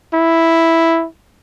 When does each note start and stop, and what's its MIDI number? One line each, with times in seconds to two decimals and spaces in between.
0.14 1.06 64